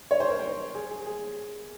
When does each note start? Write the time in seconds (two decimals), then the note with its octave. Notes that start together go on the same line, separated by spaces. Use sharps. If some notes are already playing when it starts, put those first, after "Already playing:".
0.11 C#5
0.20 C5
0.30 A#4
0.39 C5
0.75 G#4
0.90 G#4
1.06 G#4